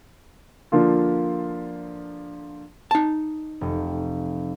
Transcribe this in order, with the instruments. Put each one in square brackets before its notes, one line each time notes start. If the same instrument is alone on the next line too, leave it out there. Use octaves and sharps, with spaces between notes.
[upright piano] D3 F3 A#3 F4
[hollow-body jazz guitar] D#4 A5
[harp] F1